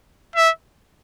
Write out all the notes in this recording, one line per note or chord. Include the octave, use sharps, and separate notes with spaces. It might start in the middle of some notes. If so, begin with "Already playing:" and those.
E5